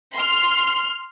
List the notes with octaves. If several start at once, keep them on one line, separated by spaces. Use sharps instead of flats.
C6 F6